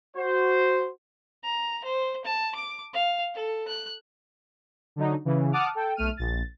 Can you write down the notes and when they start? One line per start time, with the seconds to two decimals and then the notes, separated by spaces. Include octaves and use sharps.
0.17 F#4 C5
1.43 A#5
1.85 C5
2.25 A5
2.55 D6
2.93 F5
3.34 A4
3.68 F#6
4.96 D3 F#3 D#4
5.25 C#3 E3
5.52 F#5 A5 D6 D#6 F6
5.75 A4 G5
5.96 B1 A3 F6 D#7
6.17 A#1 A6